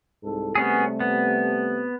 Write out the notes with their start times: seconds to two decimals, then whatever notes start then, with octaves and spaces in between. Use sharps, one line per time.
0.23 C2 G#2 A4
0.55 C3 G3 A3 B3 C#4 G#4
1.00 B3